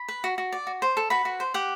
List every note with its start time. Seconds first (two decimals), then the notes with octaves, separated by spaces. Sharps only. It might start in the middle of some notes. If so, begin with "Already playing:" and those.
Already playing: B5
0.08 B4
0.24 F#4
0.38 F#4
0.52 D5
0.67 F#4
0.82 C5
0.97 A4
1.10 F#4 B4 B5
1.25 F#4
1.40 C5
1.54 G4 F#5